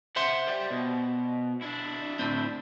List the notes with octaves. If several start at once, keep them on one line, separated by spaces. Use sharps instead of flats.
C5 E5 F#5 C6
D5 G5
B2
D4 E4
D2 A2 C4